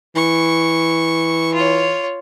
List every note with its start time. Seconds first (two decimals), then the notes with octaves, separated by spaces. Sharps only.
0.16 E3 C#6
1.54 F4 C#5